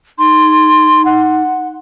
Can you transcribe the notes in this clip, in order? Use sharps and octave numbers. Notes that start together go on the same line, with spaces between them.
D#4 C6
F#5